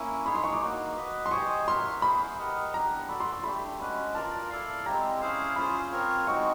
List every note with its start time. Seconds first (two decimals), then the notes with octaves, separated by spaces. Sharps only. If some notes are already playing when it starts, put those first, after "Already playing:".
Already playing: A#3 C#4 E4
0.25 D#4 G#4 C#5 B5
0.35 C6
0.44 C#6
0.53 D6
0.61 A#3 D#4 F#4
0.97 F#4 B4 D#5
1.26 C6
1.31 G4 C5 D#5 G#5 C#6
1.67 F#4 A#4 C#5 E5 C6
2.02 B3 E4 G#4 C5 B5
2.38 G4 A#4 D#5 F#5
2.73 B3 D4 G4 B4 A#5
3.08 F#4 A4 D5 B5
3.20 C6
3.33 C6
3.44 A3 D4 G4 B5
3.80 G#3 C#4 F#4 B4 B5
4.15 F4 A#4 D5 A5
4.50 E4 A4 D5 F5
4.85 G#3 C4 E4 G4 A#5
5.21 C#4 E4 G#4 C5 F5
5.56 C#4 F4 G#4 C5 B5
5.92 C4 F4 A#4 C#5
6.27 G#3 C4 D#4 F#4 C#6